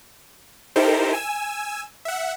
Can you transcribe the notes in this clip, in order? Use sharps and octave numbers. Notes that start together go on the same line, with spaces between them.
D#4 E4 G4 A4 A#4 C5
G#5 E6
E5 F#5